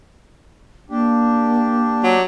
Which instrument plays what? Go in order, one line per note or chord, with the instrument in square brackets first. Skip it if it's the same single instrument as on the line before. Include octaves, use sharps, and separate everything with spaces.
[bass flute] A#3 [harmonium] D4 G4
[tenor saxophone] F#3